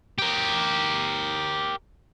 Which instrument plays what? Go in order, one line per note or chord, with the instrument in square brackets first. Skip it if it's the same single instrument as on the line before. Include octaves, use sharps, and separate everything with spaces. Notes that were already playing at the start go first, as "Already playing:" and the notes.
[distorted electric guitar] G4 A#4